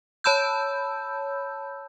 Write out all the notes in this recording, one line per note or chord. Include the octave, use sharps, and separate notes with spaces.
C#5 A5 B5 E6 G6